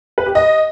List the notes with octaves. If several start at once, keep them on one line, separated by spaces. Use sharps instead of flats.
B4
G4
D#5